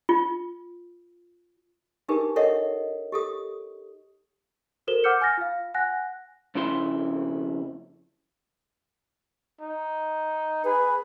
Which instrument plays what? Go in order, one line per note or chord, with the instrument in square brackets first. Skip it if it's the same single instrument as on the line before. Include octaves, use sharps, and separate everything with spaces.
[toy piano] F4
D4 D#4 G4 G#4 A#4 B4
A4 A#4 C#5 D#5 E5 F#5
G4 A4 D#6
[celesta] F#4 A4 A#4 C5 E7 G7
F#5 D6 E6 F6 G6 C#7
G#5 F6 A6 A#6
F4 F5
F#5 G#5 F#6 A#6
[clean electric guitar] F2 C#3 E4 C6
[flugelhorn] D#4
[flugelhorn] G#4 [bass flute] B4